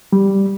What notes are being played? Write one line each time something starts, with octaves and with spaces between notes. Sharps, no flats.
G3